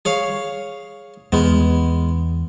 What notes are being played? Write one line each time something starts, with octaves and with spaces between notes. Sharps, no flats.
G#4 C#5 F5
E2 G#3 B3